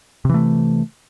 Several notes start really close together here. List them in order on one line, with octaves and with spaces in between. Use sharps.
C3 E3 A3